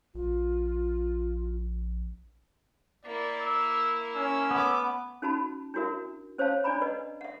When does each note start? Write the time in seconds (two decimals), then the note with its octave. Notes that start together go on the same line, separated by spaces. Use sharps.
0.15 A#1 F4
3.05 A#3 E4 D5
3.41 E6
4.16 C#4 E6
4.51 A3 B3 D6
5.22 C#4 D#4 F#4 A5 B5
5.74 D4 E4 F#4 A#4 E5
6.38 C#4 C5 C#5 F5 A5
6.64 D4 D5 G#5 A#5 B5
6.82 B4 D#5
7.21 E5 F#5